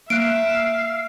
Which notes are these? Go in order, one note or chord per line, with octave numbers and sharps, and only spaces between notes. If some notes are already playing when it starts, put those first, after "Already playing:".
A#3 E5 F5 F#6 D7